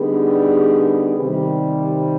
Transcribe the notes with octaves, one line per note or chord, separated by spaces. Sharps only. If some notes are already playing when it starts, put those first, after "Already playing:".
Already playing: D3 G3 B3 D#4 G#4
C3 D#3 G3